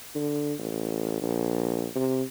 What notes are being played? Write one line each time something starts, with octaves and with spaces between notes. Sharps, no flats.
D3
A1
A#1
C3